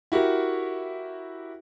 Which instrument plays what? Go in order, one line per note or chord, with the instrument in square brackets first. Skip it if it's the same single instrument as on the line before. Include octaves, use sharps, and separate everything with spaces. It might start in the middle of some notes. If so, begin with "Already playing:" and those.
[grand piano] E4 F#4 G4 A#4